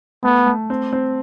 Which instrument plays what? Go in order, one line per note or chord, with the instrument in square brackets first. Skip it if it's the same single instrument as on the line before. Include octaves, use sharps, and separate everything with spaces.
[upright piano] A3 [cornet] B3
[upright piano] A3
C4
C4